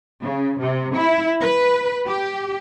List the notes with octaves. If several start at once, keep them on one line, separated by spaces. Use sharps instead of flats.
C#3
C3
E4
B4
G4